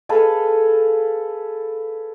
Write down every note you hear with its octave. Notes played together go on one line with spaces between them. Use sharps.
G#4 A4 B4 F5